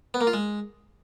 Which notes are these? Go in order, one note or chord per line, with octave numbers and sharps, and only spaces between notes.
B3
A#3
F4
G#3